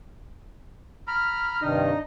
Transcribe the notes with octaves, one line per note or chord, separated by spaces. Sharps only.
A#5 B5 F6
G2 C3 D#3 D4 D#4 D#5